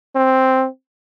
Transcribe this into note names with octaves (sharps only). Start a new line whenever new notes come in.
C4